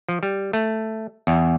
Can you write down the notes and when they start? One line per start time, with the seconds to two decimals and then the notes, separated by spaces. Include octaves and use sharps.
0.09 F3
0.23 G3
0.53 A3
1.27 E2